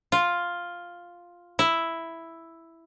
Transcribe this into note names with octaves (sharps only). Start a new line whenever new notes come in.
F4
E4